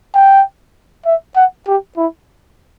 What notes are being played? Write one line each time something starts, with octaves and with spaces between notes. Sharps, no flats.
G5
E5
F#5
G4
E4